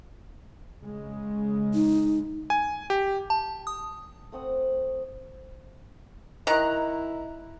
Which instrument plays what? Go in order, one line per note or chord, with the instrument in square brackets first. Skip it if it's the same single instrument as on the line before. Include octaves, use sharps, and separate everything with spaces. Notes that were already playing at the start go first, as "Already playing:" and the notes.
[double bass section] C#3 G#3
[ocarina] D#4
[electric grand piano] G#5
G4
[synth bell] A5
D#6
[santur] A3 C4 F#5 D#6
[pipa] D#3 [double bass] E4 [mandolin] A#5 F#6